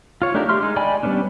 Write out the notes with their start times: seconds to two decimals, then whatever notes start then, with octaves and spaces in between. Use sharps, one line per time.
0.22 F4 C#5
0.34 A3 D4 D#4 G4 A#4
0.49 G4 E5 C6 F6
0.62 G#3 D#4
0.76 D5 D#5 G5 G#5 B5
1.03 G3 A3 B3 C#4 D4